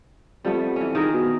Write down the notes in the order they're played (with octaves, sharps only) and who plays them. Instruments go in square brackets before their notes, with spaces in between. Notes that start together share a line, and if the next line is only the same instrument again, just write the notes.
[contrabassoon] F2 [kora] G3 A3 B3
[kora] E3 C#4
D#3 G#4 A#4
[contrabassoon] B2